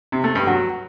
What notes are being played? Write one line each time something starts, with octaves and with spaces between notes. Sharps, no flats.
C3
A3
G2
F#3